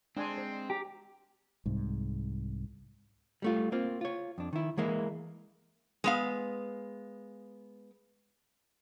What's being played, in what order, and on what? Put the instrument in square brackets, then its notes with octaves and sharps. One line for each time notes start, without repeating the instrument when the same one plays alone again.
[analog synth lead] G#3 [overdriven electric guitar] C4 [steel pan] D4 G#5 C6
[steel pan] C5
[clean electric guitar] G4 [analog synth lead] A#5
[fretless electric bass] C2 G#2
[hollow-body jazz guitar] G3 A3 F4
A#3 C4 F4
F4 C#5
F2 D4
D#3 E4
E3 G#3 A#3 E4
[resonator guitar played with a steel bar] G#3 B3 F5